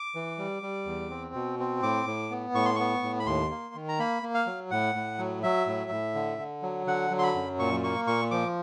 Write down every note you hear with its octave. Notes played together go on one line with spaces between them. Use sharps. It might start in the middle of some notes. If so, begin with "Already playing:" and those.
Already playing: D6
E3
G3
G3
E2
C4
B2
C4
A2 D6
A2
B3
A2 C#6
C6
B3 C#6
A2
B5
D#2 C6
A#3
D#3
A#5
A#3 B5
A#3
F5
F#3
A2 F#5
A2
F#3
F#3 E5
A2
A2
D3
D3
F#3
D3 F#5
F#3
C6
B5
F#2
A#2 C#6
A#3 C#6
A#2 C#6
F3 D6